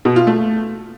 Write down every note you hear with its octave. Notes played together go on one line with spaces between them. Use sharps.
B2
F4
A3